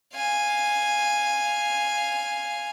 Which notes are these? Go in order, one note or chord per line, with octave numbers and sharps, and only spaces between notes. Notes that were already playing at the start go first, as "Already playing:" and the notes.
F5 G#5